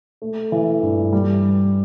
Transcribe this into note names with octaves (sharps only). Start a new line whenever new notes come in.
A3
E3
G2
G3